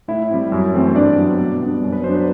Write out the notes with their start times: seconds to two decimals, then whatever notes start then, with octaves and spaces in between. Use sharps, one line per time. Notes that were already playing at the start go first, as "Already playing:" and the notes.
0.08 A2 E4 E5
0.30 G3 C4
0.52 F#2
0.74 E3 A3 C4
0.87 C5
0.95 G2 D4 D5
1.17 F#3 B3
1.38 B2
1.61 G3 B3 D4
1.82 F#2
1.92 B4
2.04 F#3 B3 D4 C5
2.15 B4